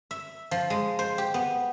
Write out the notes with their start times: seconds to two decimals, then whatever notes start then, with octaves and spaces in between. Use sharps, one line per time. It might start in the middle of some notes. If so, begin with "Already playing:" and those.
0.11 E5
0.51 F3
0.70 G#3
0.99 C5
1.18 G4
1.34 B3